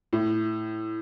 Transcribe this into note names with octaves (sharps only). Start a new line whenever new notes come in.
A2